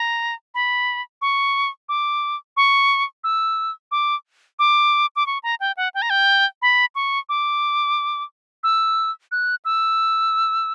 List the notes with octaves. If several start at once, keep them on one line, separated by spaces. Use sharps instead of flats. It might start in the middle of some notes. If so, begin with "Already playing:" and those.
Already playing: A#5
B5
C#6
D6
C#6
E6
D6
D6
D6
C#6
A#5
G5
F#5
G5
A#5
G5
B5
C#6
D6
E6
F#6
E6